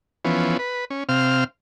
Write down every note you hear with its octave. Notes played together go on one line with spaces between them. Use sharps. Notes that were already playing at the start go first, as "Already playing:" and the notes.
E3 F3 B3 C#4
B4
C#4
C3 C4 F5 F6